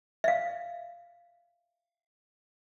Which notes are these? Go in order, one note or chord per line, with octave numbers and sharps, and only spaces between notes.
E5 F5